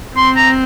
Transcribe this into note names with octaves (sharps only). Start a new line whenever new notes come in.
C4 C6
A#5